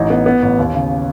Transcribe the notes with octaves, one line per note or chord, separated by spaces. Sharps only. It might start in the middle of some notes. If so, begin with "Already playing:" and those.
Already playing: A1 D#4
B3
B3
A1
D#2
C#3